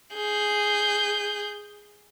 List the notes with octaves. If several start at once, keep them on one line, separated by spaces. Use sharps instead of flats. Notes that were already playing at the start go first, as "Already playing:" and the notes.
G#4 G6